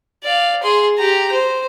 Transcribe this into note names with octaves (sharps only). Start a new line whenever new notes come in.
D5 F5
G#4 C6
G4 A#5
C5